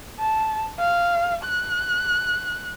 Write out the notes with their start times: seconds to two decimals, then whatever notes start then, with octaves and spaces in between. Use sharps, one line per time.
0.20 A5
0.79 F5
1.44 F#6